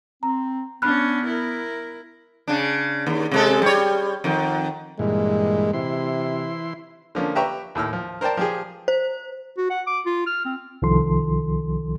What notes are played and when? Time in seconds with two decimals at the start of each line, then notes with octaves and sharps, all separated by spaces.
0.23 C4 A#5
0.82 B3 C#4 D4 B5 F6 F#6
1.26 E4 A#4
2.48 C#3 D4
3.07 D#2
3.31 C3 G#3 A4
3.62 G3 C#5
4.24 F2 D#3
4.99 G2 A#2 E3 G#3
5.74 C3 E3 E4 C6
7.15 D3 F3 A#3 C#4
7.35 G4 B4 E5 G5 A#5 C#6
7.75 D#2 A2 E6 F6
7.93 F3
8.21 A#4 C5 D5 G5 A5
8.37 F3 G4 G#4
8.88 C5
9.57 F#4
9.70 F#5
9.87 D6
10.06 F4
10.27 F6
10.45 C4
10.82 C2 D#3 F3 A4 C6